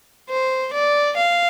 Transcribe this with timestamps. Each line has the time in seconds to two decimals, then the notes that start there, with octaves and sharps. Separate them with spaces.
0.29 C5
0.73 D5
1.17 F5